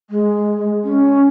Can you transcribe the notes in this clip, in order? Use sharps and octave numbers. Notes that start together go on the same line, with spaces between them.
G#3
C#4